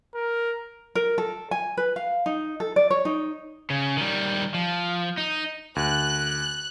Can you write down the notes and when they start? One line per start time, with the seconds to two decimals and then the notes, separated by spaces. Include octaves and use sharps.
0.15 A#4
0.95 A#4
1.18 A4
1.51 G#5
1.77 B4
1.96 F5
2.26 D#4
2.60 A4
2.76 D5
2.90 C#5
3.05 D#4
3.70 C#3
3.97 D#3 G3
4.54 F3
5.17 D#4
5.76 D2 F#6